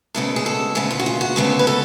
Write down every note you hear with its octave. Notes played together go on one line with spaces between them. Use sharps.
D2 C#3 G#3 B3 A4
G#4
A4
D2 C#3 G#3 B3 G#4
F4
F#4
F4
F#4
D2 C#3 G#3 B3 A4
B4
A4